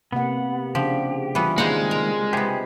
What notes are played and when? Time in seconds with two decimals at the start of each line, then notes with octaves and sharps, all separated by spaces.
0.13 C3 A#3 B3 F#5
0.75 C#3 F3 D4 G4
1.35 E3 G3 B3 F4
1.58 D#3 G#3 A#3 C4 F5 F#5
1.91 A#4
2.33 C3 B3 G4 G#4 D#5